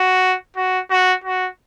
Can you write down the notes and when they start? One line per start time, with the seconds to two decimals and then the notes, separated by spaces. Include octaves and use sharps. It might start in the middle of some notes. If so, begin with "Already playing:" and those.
Already playing: F#4
0.57 F#4
0.91 F#4
1.24 F#4